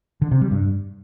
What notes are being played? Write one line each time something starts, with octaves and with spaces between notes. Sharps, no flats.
D3
C3
G3
G2